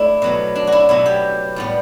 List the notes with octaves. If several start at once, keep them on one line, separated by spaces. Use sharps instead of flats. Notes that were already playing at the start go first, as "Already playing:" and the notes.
Already playing: A3 D4 E4
B2 F#3 B3
D4
F#4
E4
B2 F#3 B3 E4
G4
A2 G3 B3